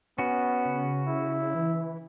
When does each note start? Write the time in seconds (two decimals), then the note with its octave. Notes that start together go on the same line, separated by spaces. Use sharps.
0.19 B3 C#4 F#4
0.65 C#3
1.07 E4
1.55 E3